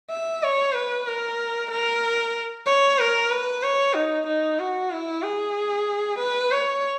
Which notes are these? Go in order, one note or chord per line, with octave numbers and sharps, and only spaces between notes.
E5
C#5
B4
A#4
A#4
C#5
A#4
B4
C#5
D#4
D#4
F#4
E4
G#4
B4
C#5